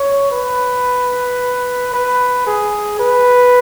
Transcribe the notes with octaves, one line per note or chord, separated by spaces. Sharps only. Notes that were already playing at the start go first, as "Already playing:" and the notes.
Already playing: C#5
B4
B4
G#4
B4